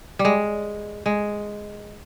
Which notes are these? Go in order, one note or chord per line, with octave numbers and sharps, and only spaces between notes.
G3
G#3
G#3